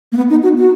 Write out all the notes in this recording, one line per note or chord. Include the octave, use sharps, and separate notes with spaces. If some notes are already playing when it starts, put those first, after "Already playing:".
A#3
B3
D#4
F#4
F#4